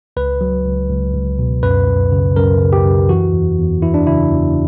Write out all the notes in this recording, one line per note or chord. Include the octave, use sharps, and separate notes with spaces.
C#2 B4
F#3
C#2
C#2
C#2
B2
F#2 B4
F#2
C#3
F#2 A#4
C#3
G4
F#2
E3 F#4
E2
E2
E3 E4
D4
C#3 E4
E2